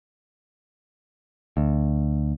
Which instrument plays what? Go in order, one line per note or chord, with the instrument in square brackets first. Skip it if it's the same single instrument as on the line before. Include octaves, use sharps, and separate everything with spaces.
[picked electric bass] D2